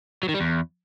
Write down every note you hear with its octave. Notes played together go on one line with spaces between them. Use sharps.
F#3
D#3
G3
E2